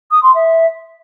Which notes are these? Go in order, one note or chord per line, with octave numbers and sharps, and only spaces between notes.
D#6
C6
E5